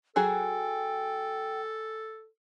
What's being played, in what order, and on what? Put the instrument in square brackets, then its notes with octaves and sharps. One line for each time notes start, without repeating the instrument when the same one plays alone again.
[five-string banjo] F#3 F#4 G#4 [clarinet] A4 [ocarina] G5 [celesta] G#5